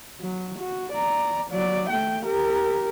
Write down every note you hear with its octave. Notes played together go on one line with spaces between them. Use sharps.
F#3
F#4
D5 A#5
F#3 D5
A3 G5
G4 A#4